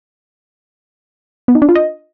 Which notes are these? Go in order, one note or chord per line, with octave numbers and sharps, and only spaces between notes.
B3
D#4
D4
F4
D#5